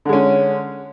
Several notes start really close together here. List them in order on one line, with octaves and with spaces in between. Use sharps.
D3 G#3 C#4